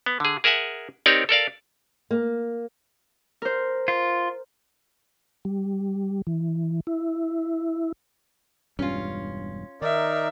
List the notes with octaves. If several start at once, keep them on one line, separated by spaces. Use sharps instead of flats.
B3
D3 G#4
G#4 A#4 E5 F#5 G#5
C4 D#4 G4 A#4 C#5 D5
A4 A#4 D5 F5
A#3
A#4 C5
F4
G3
E3
E4
E1 G2 C#4 F4
D#3 D#4 A#4 D5 E5